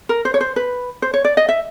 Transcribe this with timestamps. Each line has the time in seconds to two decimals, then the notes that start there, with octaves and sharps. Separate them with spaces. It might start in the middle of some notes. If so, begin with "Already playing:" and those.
0.09 A#4
0.25 C5
0.34 C#5
0.41 C5
0.56 B4
1.02 C5
1.14 C#5
1.25 D5
1.37 D#5
1.49 E5